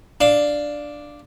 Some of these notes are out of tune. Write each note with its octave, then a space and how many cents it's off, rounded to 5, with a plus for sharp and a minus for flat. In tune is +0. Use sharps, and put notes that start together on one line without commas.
D4 +0 F5 +0